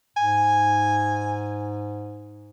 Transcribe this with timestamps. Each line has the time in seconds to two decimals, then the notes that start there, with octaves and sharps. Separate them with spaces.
0.17 G#2 G#5